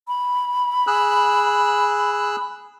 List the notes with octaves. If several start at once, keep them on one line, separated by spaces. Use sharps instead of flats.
B5
G#4 E6 F#6